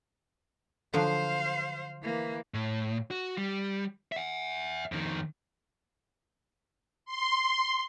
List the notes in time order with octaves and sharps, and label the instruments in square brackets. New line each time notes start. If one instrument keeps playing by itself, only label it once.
[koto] D3 F3 F#3 [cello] C5 F5
[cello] E3 A#3
[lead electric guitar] A2
F#4
G3
E5 F#5
F2 D#3
[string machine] C6